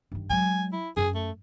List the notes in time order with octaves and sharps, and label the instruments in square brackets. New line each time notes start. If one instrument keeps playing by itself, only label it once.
[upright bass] G2 D#3
[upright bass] F#3 G#3 [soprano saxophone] G#5
[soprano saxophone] E4
[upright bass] F#2 [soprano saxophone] G#4
[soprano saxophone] A3